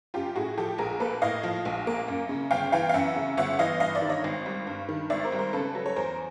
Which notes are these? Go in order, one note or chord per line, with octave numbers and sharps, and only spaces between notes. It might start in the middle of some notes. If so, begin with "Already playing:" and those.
F#2 F4 G4
A2 F#4 G#4
F3 G4 A4
A#1 G#4 A#4
A#3 A4 B4
A2 D#5 F5
F3
A#1
A#3
F#2
C#3
G1 F5 G5
E3 F5 G5
F5
F#2 E5 F#5
C#3
G1 E5 F#5
E3 D#5 F5
G2 D#5 F5
D5 E5
D#3
C#5 D#5
G#1
G3
G2
D#3
G#1 D5 E5
A#4 C5
G3
A#4 C5
C#3 A4 B4
F#3
C#5
E2 A#4 C5